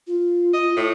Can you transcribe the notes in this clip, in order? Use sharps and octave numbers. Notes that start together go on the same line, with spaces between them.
F4
D#5
A2